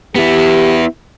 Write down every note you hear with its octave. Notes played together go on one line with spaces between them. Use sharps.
B3 E4 G4